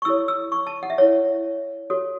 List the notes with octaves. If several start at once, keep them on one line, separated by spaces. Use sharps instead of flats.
C#6
E4 A4 C#5 E6
E6
C#6
A5
F#5
E5
E4 C#5
F#4 A4 C#5